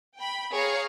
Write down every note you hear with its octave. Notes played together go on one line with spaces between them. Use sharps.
G5 B5
G#4 C#5 F5 A#5